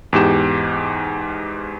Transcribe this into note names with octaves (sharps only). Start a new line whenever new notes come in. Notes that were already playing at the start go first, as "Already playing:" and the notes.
E2 G#2 G4 E7